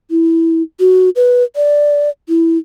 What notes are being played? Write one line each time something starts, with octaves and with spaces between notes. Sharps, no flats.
E4
F#4
B4
D5
E4